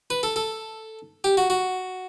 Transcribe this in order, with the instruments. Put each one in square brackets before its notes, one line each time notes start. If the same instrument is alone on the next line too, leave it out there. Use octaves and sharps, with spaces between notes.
[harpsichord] B4
A4
A4
G4
F#4
F#4